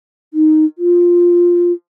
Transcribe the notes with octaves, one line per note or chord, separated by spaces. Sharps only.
D#4
F4